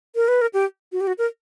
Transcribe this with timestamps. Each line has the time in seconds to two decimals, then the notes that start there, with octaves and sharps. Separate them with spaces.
0.16 A#4
0.28 B4
0.41 A#4
0.54 G4
0.92 F#4
1.01 G4
1.07 F#4
1.18 A#4